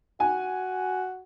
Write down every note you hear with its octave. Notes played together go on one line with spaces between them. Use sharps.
F#4 G#5